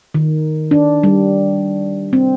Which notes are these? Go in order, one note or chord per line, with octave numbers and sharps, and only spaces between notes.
D#3
D4
G3
C4